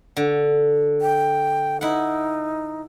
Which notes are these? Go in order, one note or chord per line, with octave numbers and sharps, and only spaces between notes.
D3
G5
D#4 E4 F#5